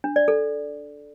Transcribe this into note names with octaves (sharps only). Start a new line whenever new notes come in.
D4
D5
A4